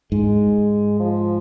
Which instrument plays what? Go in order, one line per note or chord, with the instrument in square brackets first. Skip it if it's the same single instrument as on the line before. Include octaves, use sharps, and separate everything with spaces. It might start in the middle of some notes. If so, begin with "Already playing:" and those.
[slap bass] G#2 [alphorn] G#3
[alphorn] F3